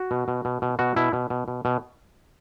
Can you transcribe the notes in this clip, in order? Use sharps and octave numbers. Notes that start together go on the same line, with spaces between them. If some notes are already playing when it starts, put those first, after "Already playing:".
Already playing: F#4
B2
B2
B2
B2
B2 F#4
B2 E4
B2
B2
B2
B2